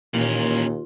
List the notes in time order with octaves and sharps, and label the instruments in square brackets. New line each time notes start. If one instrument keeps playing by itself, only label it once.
[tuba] D#2 [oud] A#2 [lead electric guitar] E3 C#4